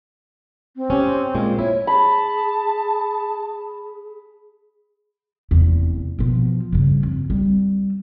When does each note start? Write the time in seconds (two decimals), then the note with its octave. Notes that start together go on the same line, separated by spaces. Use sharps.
0.76 C4
0.90 C#4 G4
1.35 A#2 G#3
1.59 E4 C#5
1.87 G#4 A5 B5
5.51 F1 E2
6.19 B2 F3
6.72 G2 C#3
7.03 F2
7.30 G3 C4